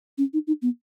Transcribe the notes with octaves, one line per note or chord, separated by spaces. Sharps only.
C#4
D#4
D#4
B3